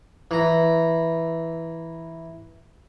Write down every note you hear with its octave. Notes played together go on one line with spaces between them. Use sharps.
E3 A#5